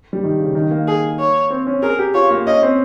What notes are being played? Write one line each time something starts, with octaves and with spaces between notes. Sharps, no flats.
G3
D#3
C#3
D#3
A#3
G#4
C#5
C4
C#4
G#4 A#4
G4
F4 C#5
A#3
C#4 D#5
C4